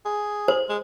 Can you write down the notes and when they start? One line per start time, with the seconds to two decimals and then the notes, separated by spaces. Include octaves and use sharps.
0.05 G#4
0.48 C5
0.69 G#3